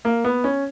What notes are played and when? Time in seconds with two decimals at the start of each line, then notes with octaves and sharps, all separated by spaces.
0.05 A#3
0.24 B3
0.44 C#4